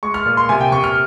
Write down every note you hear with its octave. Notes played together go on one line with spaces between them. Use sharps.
G#3 C#6
F6
A#2
C6
C3 G#5
G5
C3 C#6
F6